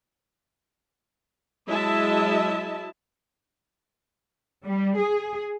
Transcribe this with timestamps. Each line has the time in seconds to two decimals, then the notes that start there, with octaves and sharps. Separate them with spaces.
1.69 F#3 G#3 E4 D#5 E5 A5
4.65 G3
4.97 G#4